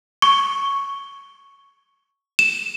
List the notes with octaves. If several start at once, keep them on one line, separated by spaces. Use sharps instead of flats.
C#6
E7